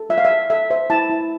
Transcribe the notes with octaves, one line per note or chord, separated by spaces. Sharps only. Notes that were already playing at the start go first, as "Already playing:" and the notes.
Already playing: A4
F4 E5
F5
E5
G#4
A4 E5
C5 E5
E4 A5
E4